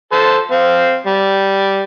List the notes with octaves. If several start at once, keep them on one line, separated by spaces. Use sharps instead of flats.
A4 C5
C4 F5
G3